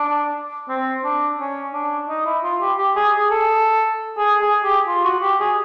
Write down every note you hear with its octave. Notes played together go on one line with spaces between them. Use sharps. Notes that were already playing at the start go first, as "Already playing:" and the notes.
Already playing: D4
C4
D4
C#4
D4
D#4
E4
F4
G4
G4
G#4
G#4
A4
G#4
G#4
G4
F4
F#4
G4
G#4